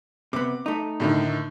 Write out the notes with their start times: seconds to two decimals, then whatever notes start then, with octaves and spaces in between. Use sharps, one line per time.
0.33 C3 B3 D6
0.66 A3 D#4
1.00 A2 D3 D#3